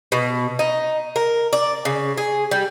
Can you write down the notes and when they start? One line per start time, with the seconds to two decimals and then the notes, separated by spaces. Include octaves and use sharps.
0.12 B2
0.59 D#4
1.16 A#4
1.53 D5
1.85 C#3
2.17 G#4
2.51 G3